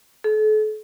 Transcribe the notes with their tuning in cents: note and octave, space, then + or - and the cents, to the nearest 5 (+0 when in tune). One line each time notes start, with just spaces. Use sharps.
A4 -40